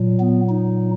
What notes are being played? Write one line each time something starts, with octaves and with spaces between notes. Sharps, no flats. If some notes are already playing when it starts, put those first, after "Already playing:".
Already playing: A#2 F#3
B3
D#4